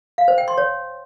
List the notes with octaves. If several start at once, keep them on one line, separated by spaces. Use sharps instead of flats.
F5
C5
G5
C6
C#5